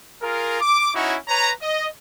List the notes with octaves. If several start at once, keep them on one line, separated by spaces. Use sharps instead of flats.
F4 G#4 A#4
D6
C#4 D#4 E4 F#4 C#5
B4 C#5 A#5
D#5